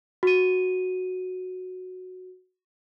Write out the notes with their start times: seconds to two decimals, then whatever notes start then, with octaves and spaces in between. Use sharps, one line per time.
0.23 F#4 D#7